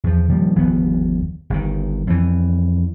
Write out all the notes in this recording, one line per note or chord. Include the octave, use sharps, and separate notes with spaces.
E2 F3
D#3 F3 G3 A#3
G1 D#2 F3 B3
G1 D#3
F2 E3